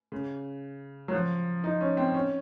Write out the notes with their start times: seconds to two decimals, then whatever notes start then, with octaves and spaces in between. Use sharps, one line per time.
0.12 C#3
1.08 F#3
1.13 F3
1.64 D#4
1.81 C#4
1.97 C4
2.14 C#4